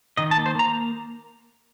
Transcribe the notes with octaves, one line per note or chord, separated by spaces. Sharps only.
D#3 D#5
A5
A#3
C5
A#3 A#5